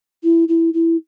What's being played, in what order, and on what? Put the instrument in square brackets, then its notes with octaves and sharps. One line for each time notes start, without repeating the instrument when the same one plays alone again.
[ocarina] E4
E4
E4